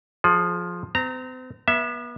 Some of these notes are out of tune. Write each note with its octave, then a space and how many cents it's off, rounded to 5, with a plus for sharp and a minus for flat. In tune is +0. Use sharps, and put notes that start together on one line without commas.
F3 +10 G#4 +30
C4 -40 A#5 -15
B3 -35 E5 +0